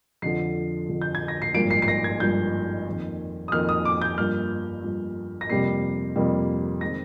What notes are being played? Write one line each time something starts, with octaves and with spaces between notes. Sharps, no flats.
F2 D3 F3 C7
F2 D3 F3
G6
G#6
A#6
C7
G#1 G2 F3 A#3 D7
C7
C7
A#6
G#6
G#1 G2 F3 A#3 G6
F2 D#3 A#3
D#6
F2 D#3 A#3 F6
D#6
D6
G6
G2 F3 A#3 F6
G2 F3 A#3
A#6
F2 C3 G3 A#3 C7
F2 C3 G3 A#3
D#3 G#3 C4 A#6